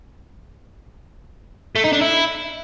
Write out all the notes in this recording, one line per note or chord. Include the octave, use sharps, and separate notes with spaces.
A3
D#4
D4
E4